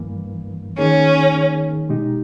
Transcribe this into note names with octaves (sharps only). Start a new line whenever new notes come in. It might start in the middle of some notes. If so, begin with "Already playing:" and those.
Already playing: G2 E3 A#3
D#3 A#3 C#4 D#4 G#4
B2 G#3 D#4 G4